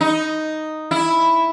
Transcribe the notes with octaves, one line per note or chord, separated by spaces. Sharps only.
D#4
E4